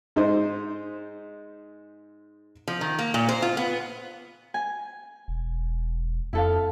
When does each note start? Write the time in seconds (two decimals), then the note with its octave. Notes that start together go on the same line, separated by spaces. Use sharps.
0.16 G#2 D#4 C5
2.68 F3
2.81 D#3
2.99 A#3
3.14 A#2
3.29 C5
3.42 F4
3.57 B3
4.54 G#5
5.28 E1
6.33 F2 E4 A4 F5